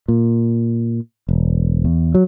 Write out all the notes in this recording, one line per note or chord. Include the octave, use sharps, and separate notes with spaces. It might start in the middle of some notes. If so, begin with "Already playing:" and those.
A#2
E1
E2
F#3